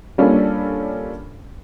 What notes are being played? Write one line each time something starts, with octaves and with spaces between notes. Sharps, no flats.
G3 A#3 C#4 D4 F4 A4